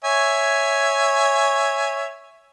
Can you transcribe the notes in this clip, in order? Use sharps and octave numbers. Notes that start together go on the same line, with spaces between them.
C#5 E5 G#5